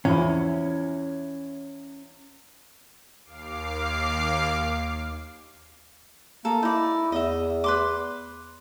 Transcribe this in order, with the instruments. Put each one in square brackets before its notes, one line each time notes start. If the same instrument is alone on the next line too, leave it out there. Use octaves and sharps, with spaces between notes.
[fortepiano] E2 F3 E4 [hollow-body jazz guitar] C#4
[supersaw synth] D#2 F5 D6 C7
[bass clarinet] A#3 [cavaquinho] A4
[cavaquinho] D#4 D5 [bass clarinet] E4
[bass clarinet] E2 [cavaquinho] D#5 E5
[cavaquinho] B4 C6 D6